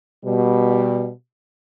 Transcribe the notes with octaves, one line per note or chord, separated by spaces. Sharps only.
B2 G3